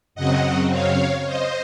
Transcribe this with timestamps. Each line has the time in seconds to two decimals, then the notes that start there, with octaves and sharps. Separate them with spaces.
0.15 F#2 C#3 F#3 C4 D#5 F#5
0.71 C#5 F5
1.26 C5 D#5